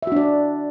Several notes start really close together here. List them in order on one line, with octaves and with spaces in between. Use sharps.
E5 F#4 D4 D5